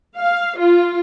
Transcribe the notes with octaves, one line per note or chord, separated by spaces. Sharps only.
F5
F4